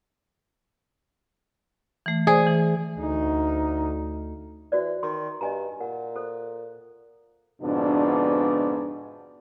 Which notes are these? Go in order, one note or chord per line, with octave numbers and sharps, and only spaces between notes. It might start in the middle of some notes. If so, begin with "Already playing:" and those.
E3 A3
G#4 C5 D5
E3
D2 D#4
E3 F#4 C5 D5
D#3 C6
G2 D#5 G#5 A#5
A#2 F#5
A4 C5
F2 G#2 B2 D3 B3 D4